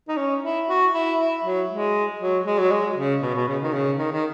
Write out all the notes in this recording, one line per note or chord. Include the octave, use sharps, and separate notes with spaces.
D#4
C#4
E4
F#4
E4
E4
F#3
G#3
F#3
G#3
F#3
G#3
C#3
B2
B2
C#3
D#3
C#3
D#3
D#3